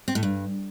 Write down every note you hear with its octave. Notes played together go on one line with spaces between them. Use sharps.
C4
A2
G2